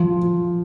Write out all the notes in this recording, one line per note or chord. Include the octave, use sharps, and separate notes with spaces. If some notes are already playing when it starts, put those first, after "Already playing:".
Already playing: F3